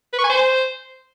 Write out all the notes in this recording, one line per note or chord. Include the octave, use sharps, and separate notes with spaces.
B4
C#6
G#5
C5